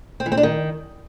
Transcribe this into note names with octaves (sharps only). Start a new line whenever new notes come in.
C4
E3
C4
D4
D#3